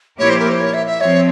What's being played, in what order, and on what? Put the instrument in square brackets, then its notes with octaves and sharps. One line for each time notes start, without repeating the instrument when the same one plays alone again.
[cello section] A#2 F3 A#3 E4 G4 [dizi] C#5
[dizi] C5
A#4
C5
C#5
E5
E5
[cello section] F3 C4 [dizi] C#5